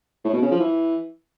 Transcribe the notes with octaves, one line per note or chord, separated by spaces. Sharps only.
A2
B2
C#3
F3
E3